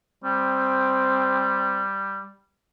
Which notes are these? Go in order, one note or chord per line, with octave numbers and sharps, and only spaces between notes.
G3 C4